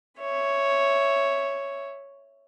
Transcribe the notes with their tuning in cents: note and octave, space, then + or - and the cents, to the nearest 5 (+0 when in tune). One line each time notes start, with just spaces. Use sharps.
C#5 +0 E5 +5